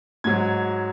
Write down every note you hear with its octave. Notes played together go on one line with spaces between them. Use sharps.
G#2 F#3 G#6